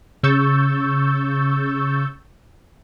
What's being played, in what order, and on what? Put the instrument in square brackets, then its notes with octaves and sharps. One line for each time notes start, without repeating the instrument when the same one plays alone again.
[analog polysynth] C#3 C#6 E6 G6 A6